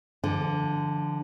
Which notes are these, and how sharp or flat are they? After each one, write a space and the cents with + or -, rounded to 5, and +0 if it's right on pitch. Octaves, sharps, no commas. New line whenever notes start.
D3 +0 F3 -40